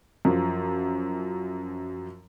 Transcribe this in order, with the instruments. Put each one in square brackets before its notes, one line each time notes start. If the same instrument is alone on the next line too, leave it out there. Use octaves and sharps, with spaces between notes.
[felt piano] F#2 F3